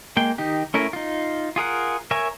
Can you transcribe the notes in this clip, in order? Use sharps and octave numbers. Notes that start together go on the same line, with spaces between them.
G#3 A#3 G5
D#3 D#4 G4
A3 C#4 E4 A#4
D#4 F4
F4 G#4 A#4 F#5
A#4 C#5 E5 G#5